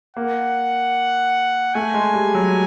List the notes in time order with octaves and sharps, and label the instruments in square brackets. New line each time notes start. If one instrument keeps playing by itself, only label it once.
[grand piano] A#3 [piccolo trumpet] F#5
[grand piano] A3 [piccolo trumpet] G#5
[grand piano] G#3
G3
F#3